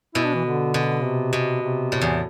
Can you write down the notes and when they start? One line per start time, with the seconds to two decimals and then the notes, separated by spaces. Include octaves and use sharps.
0.15 B2 E4
0.25 D4
0.35 E3
0.45 D3
0.74 B2
1.04 C3
1.33 B2
1.62 C3
1.92 A2
2.01 E2